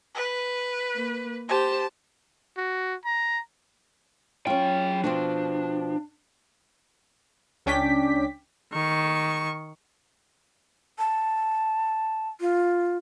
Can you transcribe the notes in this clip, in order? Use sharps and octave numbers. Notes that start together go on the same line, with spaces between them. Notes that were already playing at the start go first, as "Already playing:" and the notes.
B4
A#3
G4 C5 A5
F#4
A#5
F#3 C#4 F4 G5
B2 F3 C4 D4
C#2 C#4 D4 G5 D6 B6
D#3 C#6
A5
F4